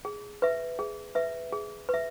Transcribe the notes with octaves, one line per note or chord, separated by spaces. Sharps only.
G#4
B4 E5
G#4
B4 E5
G#4
B4 E5